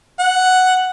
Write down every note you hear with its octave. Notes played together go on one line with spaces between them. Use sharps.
F#5